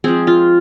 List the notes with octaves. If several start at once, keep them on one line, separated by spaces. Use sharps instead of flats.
F3 G#3 C4 G#4
F4